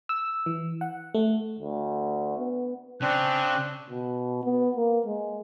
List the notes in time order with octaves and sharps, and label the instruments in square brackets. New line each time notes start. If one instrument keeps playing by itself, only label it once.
[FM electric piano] E6
E3
F#5
A3
[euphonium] D2
B3
[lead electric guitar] C#3 [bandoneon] C4 D4 [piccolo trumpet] F#6
[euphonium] B2
B3
A#3
G#3